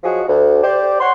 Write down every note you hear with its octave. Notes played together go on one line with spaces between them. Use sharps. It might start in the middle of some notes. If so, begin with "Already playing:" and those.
F3 F#3 D#4 F#4 G#4
D2
G4 C5 D5
C#5 F#5 C6